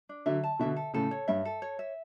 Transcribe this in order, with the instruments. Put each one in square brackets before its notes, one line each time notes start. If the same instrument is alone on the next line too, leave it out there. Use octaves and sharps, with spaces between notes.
[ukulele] D4
[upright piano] D3 F#3 [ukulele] E5
[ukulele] A5
[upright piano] B2 D3 [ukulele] E5
[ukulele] A4
[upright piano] A2 C#3 [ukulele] A4
[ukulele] C#5
[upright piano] G2 [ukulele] E5
[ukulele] A4
C#5
E5